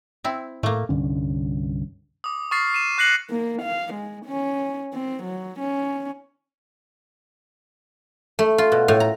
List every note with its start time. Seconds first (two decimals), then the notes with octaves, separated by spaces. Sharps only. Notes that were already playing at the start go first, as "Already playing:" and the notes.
0.24 C4 E4
0.63 A2 A3 A#3
0.89 C2 G2 D3 C#4
2.24 D6 D#6
2.51 C#6 D#6 F6 A6 C7
2.73 C7 D#7 E7
2.98 C#6 F#6 A#6 C7 C#7 F#7
3.30 A#3
3.62 F5
3.94 G#3
4.26 C#4
4.94 C4
5.23 F#3
5.60 C#4
8.39 A3
8.58 F4
8.72 B2
8.88 A2
9.00 A#5